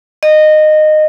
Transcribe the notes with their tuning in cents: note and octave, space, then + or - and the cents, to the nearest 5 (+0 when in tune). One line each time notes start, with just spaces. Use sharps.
D#5 -15